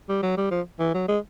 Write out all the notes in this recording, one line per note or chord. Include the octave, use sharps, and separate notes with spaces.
G3
F#3
G3
F3
E3
F#3
G#3